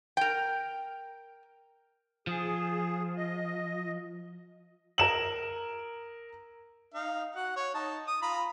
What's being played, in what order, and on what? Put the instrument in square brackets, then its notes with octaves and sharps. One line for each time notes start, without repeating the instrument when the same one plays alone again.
[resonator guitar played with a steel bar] A#4 G5
[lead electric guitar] F3 [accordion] G#4
[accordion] D#5
[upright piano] A#4 E7 F#7
[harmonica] D#4 F5
F#4 F#5
C#5
D#4 A5
D#6
F4 A#5 B5